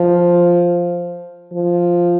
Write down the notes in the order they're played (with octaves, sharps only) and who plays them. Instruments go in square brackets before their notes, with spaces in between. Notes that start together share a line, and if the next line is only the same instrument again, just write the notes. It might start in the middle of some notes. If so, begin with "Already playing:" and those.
Already playing: [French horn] F3
F3